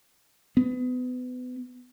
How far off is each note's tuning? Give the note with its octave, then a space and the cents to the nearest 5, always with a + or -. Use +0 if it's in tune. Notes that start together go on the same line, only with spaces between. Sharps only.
B3 +30